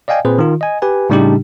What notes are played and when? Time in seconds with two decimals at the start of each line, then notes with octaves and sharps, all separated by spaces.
0.08 D5 D#5 F5 G5 G#5
0.25 A#2 C4 G#4 B4 C5
0.39 D#3 F4
0.61 D#5 G#5
0.82 G4 B4 G#5
1.10 A2 C#3 G3 D4 D#4 G4